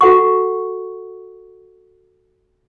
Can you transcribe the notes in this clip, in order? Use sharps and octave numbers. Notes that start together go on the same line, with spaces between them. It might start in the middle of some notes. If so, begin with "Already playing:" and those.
F#4 A4 F#5 C#6